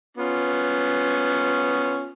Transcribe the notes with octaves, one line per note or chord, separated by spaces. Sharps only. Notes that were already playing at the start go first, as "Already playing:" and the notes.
B3 C#4 F4